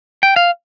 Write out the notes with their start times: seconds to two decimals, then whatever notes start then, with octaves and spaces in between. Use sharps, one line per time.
0.23 G5
0.36 F5